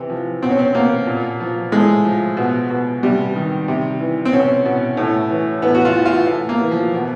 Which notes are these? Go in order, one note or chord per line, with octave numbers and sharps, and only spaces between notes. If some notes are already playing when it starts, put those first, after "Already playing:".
Already playing: C3 E3
F3
B2 C4
C#4
C4
B2 A#3
A#2
F3
A2 G#3
F3
B2
B2
C3 G3
D#3
C3
E3
C4
B2 C#4
B2
A2
E3
A2 B3
F#4
F4
E3
F4
A2
A#3
E3
F3
B2